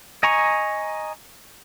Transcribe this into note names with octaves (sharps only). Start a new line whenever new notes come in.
D#5 G#5 A#5 C#6